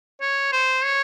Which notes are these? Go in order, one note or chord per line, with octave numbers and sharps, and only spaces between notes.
C#5
C5
C#5